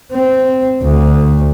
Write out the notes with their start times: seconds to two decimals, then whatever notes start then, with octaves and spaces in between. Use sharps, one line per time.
0.13 C4
0.83 D2